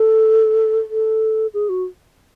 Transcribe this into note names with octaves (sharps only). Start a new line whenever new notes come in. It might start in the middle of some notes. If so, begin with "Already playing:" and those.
Already playing: A4
A4
G#4
F#4